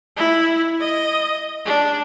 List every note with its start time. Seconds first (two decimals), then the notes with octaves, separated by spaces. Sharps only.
0.17 E4
0.80 D#5
1.66 D4